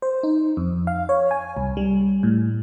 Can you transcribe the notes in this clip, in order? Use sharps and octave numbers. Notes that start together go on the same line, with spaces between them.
C5
D#4
F2
F5
C#5
G#5
C2
G3
A2